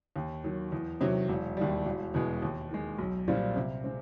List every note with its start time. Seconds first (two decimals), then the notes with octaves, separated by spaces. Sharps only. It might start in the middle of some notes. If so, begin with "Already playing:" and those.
0.16 D#2
0.44 D#3 F#3
0.72 E2
1.01 C3 D#3 F#3
1.29 E1
1.57 D#2 D#3 G3
1.85 E1
2.14 E2 B2 G#3
2.42 D#2
2.71 D#3 G#3
2.98 B1
3.28 A#2 G3 C4 F4
3.56 C3
3.84 G#3 C4